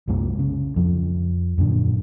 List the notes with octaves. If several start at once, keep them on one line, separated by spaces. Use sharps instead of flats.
C2 F#2 G#3 A#3
C#3
F2 F3
F#2 A#2 D3